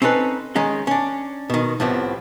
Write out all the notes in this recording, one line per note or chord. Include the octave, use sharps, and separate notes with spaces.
C4 C#4 D#4 A4 B4
D#3 G#3 C#4 D#4
C#4 D4
B2 D#3
C2 A2 F3 B3 C4